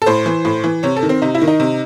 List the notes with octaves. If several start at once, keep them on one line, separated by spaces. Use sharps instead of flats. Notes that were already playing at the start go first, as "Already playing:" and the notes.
A4
A2 C5
E3
A2
E3
C3 C#5
A4
D#3
C4
C3 D#4
E4
D#3
D#4
C3